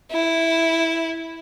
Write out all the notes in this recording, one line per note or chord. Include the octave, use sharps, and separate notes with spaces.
E4